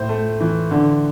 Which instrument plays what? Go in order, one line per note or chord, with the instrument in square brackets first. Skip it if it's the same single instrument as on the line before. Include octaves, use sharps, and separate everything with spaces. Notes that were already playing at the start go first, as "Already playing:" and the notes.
Already playing: [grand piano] A2 C5
A3
E3
D3